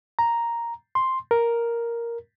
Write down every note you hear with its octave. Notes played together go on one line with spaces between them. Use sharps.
A#5
C6
A#4